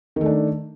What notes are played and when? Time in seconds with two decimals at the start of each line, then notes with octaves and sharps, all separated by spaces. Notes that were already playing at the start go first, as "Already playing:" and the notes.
0.16 D#3
0.21 A3
0.26 D4